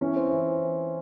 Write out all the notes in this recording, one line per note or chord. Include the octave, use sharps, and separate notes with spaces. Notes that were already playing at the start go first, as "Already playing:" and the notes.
E3 C#4
C4
E3 E4